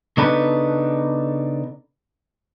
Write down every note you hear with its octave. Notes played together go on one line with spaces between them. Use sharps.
C#3 B3 D4 D#4 A4 B4